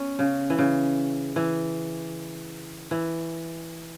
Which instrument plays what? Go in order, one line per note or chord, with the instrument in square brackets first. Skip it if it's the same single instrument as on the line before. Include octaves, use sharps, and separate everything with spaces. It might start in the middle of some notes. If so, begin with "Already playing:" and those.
Already playing: [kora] B3 C#4
C#3
E3
C#3
E3
E3